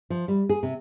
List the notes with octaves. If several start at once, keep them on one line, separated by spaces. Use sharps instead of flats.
F3
G3
G#4
C3